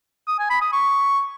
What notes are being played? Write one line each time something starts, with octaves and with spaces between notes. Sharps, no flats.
D#6
G#5
B5
D#6
C#6